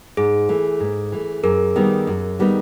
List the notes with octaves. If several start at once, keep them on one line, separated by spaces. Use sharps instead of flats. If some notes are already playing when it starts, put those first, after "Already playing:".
G#2 G#4
E3 A3
G#2
E3 A3
F#2 G#4 A#4
D#3 G3 B3 D#4
F#2
D#3 G3 B3 D#4